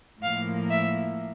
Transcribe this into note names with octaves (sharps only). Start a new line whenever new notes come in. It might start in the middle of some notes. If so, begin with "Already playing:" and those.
A2 F3 A#3 F5
E5